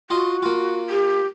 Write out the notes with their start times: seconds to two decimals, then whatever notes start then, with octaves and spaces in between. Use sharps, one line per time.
0.10 F4 F#4 D#5 C6
0.43 A#3 F4
0.90 G4